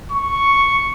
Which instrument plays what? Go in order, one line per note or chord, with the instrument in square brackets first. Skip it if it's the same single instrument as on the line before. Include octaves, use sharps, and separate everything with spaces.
[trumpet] C#6